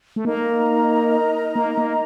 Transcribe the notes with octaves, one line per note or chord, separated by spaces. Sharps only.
A3
A#3 D#4 A#4 D#5 A#5
A#3
A#3